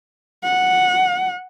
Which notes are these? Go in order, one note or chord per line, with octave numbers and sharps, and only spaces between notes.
F#5